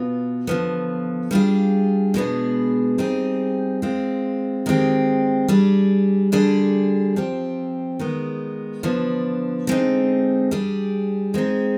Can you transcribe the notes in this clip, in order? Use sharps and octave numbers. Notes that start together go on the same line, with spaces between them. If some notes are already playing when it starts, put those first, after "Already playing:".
Already playing: B2 B3 F4
D3 F3 B3
G3 D4 F4 G#4
B2 G#3 B3 D4 G#4
G3 C4 D#4 G#4
G#3 C4 F4
D#3 G#3 C4 G4
G3 D4 G#4
D3 G3 D4 G#4
F3 C4 G4
D#3 G#3 B3
D3 F3 B3 D4
D3 G#3 C4 D#4
G3 D4 G#4
G#3 C4 D#4 G#4